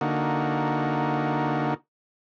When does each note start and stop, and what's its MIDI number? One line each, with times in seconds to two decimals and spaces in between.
0.01 1.74 50
0.01 1.74 58
0.01 1.74 63
0.01 1.74 66